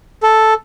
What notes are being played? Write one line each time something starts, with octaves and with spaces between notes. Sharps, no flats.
A4